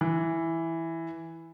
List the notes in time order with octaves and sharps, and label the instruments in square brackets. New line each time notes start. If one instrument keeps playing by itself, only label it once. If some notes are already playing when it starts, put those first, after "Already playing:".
[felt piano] E3